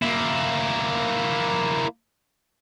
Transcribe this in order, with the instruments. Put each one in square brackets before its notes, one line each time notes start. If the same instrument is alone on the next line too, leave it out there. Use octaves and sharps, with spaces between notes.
[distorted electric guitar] A#3 E4